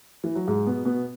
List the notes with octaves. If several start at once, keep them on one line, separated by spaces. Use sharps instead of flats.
E3
F#3
G#2 G#3
B2 B3
B2 B3